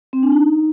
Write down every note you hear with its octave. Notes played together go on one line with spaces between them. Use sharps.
C4
D4
D#4